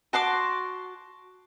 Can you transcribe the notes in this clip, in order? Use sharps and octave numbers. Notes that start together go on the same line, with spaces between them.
F#4 A5 C6 D6